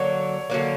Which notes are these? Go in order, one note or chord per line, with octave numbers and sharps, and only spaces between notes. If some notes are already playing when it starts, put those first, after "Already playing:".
Already playing: D3 F#3 A#3 C#5
D3 F#3 A#3